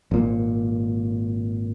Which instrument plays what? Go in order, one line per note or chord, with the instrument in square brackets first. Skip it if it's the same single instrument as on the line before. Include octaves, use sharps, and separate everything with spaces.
[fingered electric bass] G#1 A#2